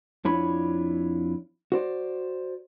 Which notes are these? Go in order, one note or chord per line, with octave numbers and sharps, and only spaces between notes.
F2 D4 E4 F4 C#5 B5
F#4 C5 D5